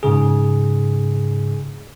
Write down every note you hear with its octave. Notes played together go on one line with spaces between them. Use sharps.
G#2 C#3 G#4